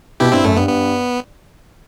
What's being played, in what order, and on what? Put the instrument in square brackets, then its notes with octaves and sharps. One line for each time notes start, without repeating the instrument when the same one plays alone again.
[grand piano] B2 [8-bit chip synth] E4 G4
[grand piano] G2 [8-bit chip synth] C4 E4
[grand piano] F#2 [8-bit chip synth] A3
[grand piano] G2 [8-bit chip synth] B3
[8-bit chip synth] B3